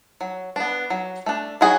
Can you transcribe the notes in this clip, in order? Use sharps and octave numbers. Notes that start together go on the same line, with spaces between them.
F#3
B3 D4
F#3
A3 D4
F#3 F#4 G#4